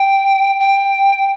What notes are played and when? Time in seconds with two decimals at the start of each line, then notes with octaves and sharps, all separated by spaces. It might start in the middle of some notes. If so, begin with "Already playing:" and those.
Already playing: G5
0.60 G5